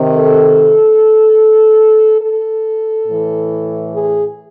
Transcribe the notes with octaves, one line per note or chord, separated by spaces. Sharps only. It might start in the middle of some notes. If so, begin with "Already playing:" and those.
Already playing: C3 D#3
A4
A4
A2 E3
G#4